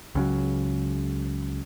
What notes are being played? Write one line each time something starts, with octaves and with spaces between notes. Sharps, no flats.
C#2 C#3 F#3